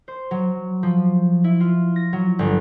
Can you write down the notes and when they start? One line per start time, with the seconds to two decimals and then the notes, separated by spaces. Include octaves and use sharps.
0.08 C5
0.31 F#3
0.83 F3
1.44 E4
1.60 F4
1.96 A#6
2.13 F#3
2.39 G1